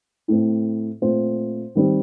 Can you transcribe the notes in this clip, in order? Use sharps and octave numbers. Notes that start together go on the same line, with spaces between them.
A2 A3 C4
A#2 A3 C4 C5
D#3 G3 C4